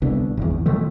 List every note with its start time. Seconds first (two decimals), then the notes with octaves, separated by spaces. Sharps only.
0.02 C2 B2 D3
0.37 G#1 E2
0.66 B2 D#3 F3 A3